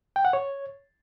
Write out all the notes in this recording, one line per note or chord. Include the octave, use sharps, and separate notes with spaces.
G5
F#5
C#5